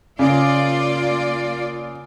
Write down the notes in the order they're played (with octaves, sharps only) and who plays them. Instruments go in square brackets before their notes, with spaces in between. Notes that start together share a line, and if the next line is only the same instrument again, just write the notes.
[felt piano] C#3 [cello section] A#3 F4 D5